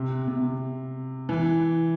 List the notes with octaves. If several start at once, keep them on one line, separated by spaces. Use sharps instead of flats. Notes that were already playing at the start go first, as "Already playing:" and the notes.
Already playing: C3
C3
E3